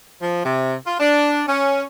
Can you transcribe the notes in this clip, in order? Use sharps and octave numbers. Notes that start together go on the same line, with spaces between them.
F3
C3
F4
D4
C#4